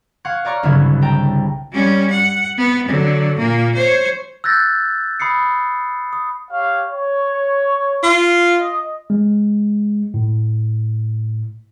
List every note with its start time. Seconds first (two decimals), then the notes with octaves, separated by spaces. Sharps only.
0.25 F5 F#5 C#6 G#6
0.45 C#5 D5 A#5 C#6 F6
0.63 G1 C2 C#3 F#3 E4 G#6
1.02 G5 A5 A#5
1.72 G3 C#4
2.10 F#5
2.57 B3
2.88 D3 F#3
3.38 A#2 A#3
3.75 C5 C#5
4.44 E6 F#6 G6 A6 A#6
5.20 B5 D#6 C7 C#7
6.13 D#6
6.51 G4 C#5 F5
6.89 C#5
8.03 F4
8.56 D#5
9.10 G#3
10.14 A2